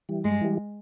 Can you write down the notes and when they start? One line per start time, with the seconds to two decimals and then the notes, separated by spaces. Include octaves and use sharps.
0.09 E3 G3
0.24 G2 G#3
0.41 E3 G3